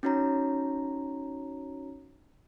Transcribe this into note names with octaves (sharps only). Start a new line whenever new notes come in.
C#4 D#4 F#4 C#5 A#5